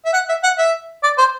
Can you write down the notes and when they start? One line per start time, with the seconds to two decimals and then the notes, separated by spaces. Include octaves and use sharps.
0.05 E5
0.13 F#5
0.29 E5
0.43 F#5
0.58 E5
1.03 D5
1.18 C5